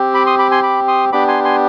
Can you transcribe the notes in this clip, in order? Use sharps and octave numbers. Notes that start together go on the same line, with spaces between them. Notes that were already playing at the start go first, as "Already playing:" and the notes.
Already playing: C4 G4
B5 D6
C6 D#6
B5 D6
G#5 C6
B5 D6
C6 D#6
B3 D4 G4 B5 D6
G#5 C6
G#5 C6